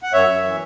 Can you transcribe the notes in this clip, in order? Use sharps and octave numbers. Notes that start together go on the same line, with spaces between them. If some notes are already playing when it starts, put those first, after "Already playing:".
F#5
F#2 C#5 E5
F#2
E3